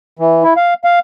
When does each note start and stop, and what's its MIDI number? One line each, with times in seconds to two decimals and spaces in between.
0.19 0.44 52
0.44 0.54 64
0.57 0.74 77
0.84 0.99 77